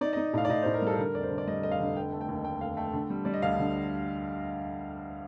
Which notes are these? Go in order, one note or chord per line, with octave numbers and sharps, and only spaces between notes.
D#4 D5
D#5
D#4
A2 F5
D5
A2 D#5
A2 C5
A#4
G3 A4
A4
D3 A#4
F1 D5
C5
D3
D5
G3 D#5
F1 D#5
F5
D3
F1 G5
A3
G5
D#2
F1 G5
F1 F5
A3 G5
D3
G3
G3 D5
D#5
D2 F5
D3